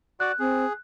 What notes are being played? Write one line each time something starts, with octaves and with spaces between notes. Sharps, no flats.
F#4 D5 F#6
C4 G#4